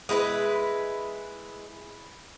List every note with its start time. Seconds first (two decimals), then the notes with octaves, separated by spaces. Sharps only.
0.09 G#3 E4 F4 B4